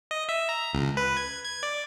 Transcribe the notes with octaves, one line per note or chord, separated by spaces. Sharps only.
D#5
E5
A#5
C#2
B4
G#6
G#6
D5